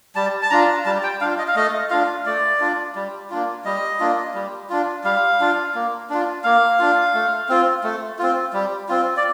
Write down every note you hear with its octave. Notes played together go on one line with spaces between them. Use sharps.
G3 A5
A5
D4 F4 A#5
G3 A5
G5
D4 F4 F5
D#5
F5
A3 D#5
D4 F4 F5
A3 D5
D4 F4
G3
A#3 D4 F4
G3 D#5
A#3 D4 F4
G3
D4 F4
G3 F5
D4 F4
A#3
D4 F4
A#3 F5
D4 F4
A3
C4 F4
A3
C4 F4
G3
C4 F4
D5